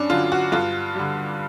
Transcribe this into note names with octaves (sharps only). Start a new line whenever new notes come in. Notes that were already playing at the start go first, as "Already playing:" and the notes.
Already playing: G2 C#4 D4
D3 F#3 F4
F#4
G2 F4
D3 G3